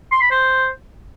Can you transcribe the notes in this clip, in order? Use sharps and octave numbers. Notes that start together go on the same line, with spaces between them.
C6
B5
C5